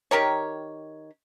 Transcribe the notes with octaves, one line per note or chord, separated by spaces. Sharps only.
D#3 G4 A#4 C#5